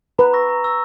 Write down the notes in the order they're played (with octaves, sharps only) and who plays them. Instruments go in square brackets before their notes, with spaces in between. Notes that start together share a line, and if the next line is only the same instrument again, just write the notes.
[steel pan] B4 [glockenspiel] A#5
[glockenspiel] C#6 E6 A#6
A#5
C#6 E6 A#6